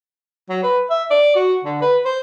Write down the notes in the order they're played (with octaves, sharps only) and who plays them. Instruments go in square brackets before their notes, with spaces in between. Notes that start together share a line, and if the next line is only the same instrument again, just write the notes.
[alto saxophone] F#3
B4
E5
D5
F#4
D3
B4
C5